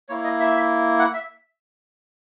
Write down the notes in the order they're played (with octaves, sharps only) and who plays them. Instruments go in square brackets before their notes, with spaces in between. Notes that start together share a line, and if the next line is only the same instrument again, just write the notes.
[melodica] A#3 E4 C#5
D#5
E5
F#5
E5